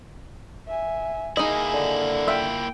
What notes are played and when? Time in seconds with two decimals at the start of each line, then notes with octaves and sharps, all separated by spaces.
0.68 E5 G#5
1.37 A#3 D#4 E4 G#4 D#5
1.73 D3
2.28 F4 E5 G5